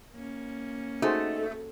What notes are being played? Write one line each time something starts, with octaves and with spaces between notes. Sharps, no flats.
A#3 C#4
A3 D#4 F#4 G#4 C5